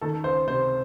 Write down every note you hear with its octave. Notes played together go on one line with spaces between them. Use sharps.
D#3 A4
C#2 C5
C3 C5